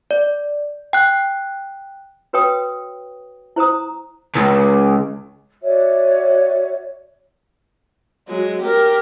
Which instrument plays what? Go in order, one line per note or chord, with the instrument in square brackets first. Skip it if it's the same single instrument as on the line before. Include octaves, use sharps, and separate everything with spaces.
[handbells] D5
G5 F#6
[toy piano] F#4 B4 C#5 G5 D#6
E4 C5 A#5 D#6
[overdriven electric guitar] C#2
[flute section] F#4 C#5 D5 E5
[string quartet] F#3 G#3
G4 A#4